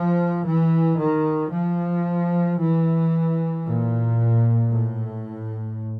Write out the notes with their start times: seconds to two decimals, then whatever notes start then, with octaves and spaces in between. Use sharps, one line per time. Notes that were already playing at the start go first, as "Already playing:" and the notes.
Already playing: F3
0.46 E3
0.98 D#3
1.52 F3
2.59 E3
3.66 A#2
4.72 A2